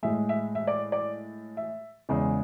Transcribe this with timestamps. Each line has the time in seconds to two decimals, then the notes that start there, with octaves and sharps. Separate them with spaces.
0.03 A2 G#3 E5
0.29 E5
0.55 E5
0.67 D5
0.92 D5
1.57 E5
2.09 E2 C#3 G#3